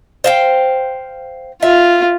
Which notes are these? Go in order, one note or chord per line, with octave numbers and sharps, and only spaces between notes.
C5 F5 G5
F4 E5